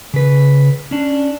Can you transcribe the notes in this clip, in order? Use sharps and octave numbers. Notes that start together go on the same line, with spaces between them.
C#3 B4
C#4 D4